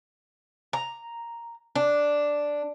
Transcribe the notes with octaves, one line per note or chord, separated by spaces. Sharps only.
A#5
D4